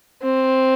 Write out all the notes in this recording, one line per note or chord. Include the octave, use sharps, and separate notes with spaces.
C4